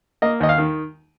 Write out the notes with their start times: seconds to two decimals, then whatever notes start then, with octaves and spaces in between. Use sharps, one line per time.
0.22 A#3 D#5
0.40 D#2 D#5
0.49 F5
0.58 D#3